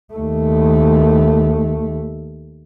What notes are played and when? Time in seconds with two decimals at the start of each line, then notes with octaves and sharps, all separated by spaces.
0.14 D#2 A3